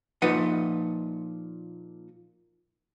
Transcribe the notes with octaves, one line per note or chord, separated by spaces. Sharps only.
A#2 F3 D#4 B4 F#5